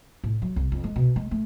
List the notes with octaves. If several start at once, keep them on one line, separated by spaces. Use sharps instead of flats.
A2
F#3
C2
F2
G#3
B2
G#3
A3